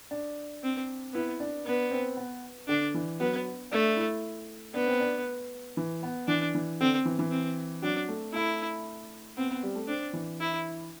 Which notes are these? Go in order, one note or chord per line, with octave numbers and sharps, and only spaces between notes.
D4
C4
B3 E4
D4
B3 D4
C4
B3
D3 D4
E3
F#3 B3
A3 D4
E4
B3 D4
C4
D4
E3
B3
E3 D4
E3
D3 C4
E3
E3
C4
F#3 D4
A3
A3 E4
B3 C4
B3
G3
A3
C4 D4
E3
E4